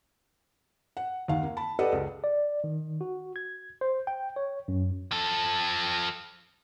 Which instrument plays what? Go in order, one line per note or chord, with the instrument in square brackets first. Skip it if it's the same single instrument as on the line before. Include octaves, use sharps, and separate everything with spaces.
[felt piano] F#5
D#2 D#3 F5 F#5
A#3
A5 B5
G4 A4 B4 D5 D#5 F#5
C#2
[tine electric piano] D5
D#3
F#4
G#6
C5
G5
C#5
F#2
[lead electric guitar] F3 A4